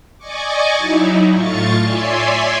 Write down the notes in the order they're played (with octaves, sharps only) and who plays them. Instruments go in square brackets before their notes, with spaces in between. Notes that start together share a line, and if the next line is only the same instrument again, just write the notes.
[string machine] D5 D#5 G#5 C#6 D6
F#3 D#4 E4
A2 F4 C#6 A6 C#7
C#5 D5 E5 G#5 C6